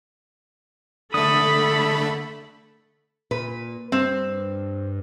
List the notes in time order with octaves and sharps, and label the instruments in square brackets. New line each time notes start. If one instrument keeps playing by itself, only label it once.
[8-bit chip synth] D3 A3 [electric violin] A4 B5 [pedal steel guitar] D#6
[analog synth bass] A#2 [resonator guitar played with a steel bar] B4
[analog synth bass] G2 [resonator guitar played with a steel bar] C4